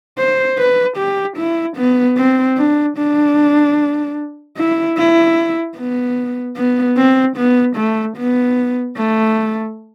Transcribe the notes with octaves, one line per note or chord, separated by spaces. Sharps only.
C5
B4
G4
E4
B3
C4
D4
D4
E4
E4
B3
B3
C4
B3
A3
B3
A3